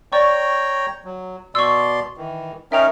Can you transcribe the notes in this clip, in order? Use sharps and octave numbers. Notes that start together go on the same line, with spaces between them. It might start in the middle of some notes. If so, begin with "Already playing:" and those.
C#5 D5 G5 A#5 C#6
F#3
B2 D5 C6 C#6 E6
D#3 E3
C#4 D#4 A#4 E5 G5 F7